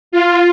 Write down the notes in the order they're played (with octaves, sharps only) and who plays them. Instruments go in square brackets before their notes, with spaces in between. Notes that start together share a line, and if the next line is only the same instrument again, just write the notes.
[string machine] F4